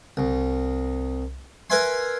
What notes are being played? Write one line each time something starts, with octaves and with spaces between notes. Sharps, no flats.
C2
A#4 B4 E5 G#5 C6